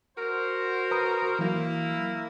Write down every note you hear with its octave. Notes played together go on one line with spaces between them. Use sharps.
F#4 A#4 C5
B4 A#5 D#6
E3 F#3 A#3 E4